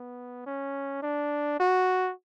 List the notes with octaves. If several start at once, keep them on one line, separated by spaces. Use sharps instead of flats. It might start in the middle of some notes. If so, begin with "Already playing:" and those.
Already playing: B3
C#4
D4
F#4